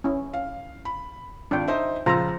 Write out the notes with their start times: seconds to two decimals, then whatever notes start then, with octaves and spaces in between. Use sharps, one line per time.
0.04 C#4 E4
0.34 F5
0.85 B5
1.51 G#1 D4 F4 G5
1.68 D#4 C5 E5
2.06 C#2 F3 F4 C5 A#5 E6